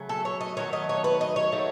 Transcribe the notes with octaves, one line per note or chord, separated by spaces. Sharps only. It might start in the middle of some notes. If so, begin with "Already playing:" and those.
Already playing: C#3 F#3 A3
A4
C#5
D#5
D#3 F#3 A3 C#5
D#5
C#5
B4
D#5
C#5
D#3 F#3 A3